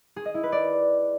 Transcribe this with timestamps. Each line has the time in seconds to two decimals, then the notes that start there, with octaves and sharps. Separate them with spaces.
0.16 G#4
0.25 D#5
0.34 E4
0.43 B4
0.52 D5